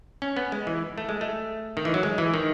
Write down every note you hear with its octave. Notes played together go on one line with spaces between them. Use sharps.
C#4
B3
G#3
E3
A3
G#3
A3
D#3
E3
F#3
G#3
E3
D#3